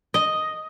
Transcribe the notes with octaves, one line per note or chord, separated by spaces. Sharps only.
D#5